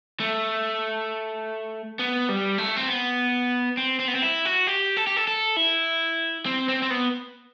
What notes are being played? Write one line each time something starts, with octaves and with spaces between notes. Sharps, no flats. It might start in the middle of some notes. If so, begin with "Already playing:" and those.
A3
B3
G3
A3
C4
B3
C4
C4
B3
C4
E4
F#4
G4
A4
G4
A4
A4
E4
C4
C4
C4
B3